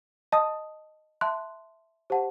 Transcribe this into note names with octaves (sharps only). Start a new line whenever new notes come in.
D#5 A5 D#6
E5 A5 C6 F#6
G4 C5 F#5 A5